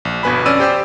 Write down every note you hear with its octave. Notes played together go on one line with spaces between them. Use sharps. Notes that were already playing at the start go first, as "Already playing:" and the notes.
A#1
G1 G2 B2 B4 G#5 B5
F2 C#4 D5 E6 D#7
G4 C5 D5 G5 E6